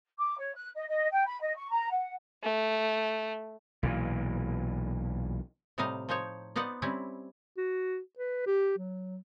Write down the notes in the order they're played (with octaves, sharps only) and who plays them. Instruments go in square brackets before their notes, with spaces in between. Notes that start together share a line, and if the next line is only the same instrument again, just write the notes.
[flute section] D6
C#5
F#6
D#5
D#5
G5
B5
D#5
C#6
A#5
F#5
[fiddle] A3
[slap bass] B1 A#2 E3
[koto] A2 C3 G3 D#4 D#5 F5
F3 D#4 C5 C#5
B3 D#4 C5 D5 F#5
G3 C4 C#4 E4
[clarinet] F#4
B4
G4
F#3